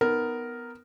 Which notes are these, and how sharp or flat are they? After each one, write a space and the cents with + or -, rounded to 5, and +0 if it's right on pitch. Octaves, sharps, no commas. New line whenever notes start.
B3 +10 D#4 +0 A#4 +0